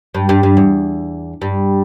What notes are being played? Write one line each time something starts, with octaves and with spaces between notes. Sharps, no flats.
G2
G2
G2
E2
G2